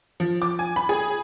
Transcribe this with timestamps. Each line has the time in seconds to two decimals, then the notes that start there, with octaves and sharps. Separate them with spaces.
0.20 F3
0.42 D6
0.59 G#5
0.76 B5
0.89 G#4